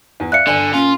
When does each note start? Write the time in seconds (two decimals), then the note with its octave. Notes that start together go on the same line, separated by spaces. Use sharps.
0.20 E2
0.32 D5 E5 F5 F#6 C#7
0.47 G1 D3 D5 G#5
0.73 A#2 C#4 F4 G#5